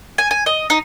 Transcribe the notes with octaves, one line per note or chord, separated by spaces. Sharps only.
G#5
G#5
D#5
D#4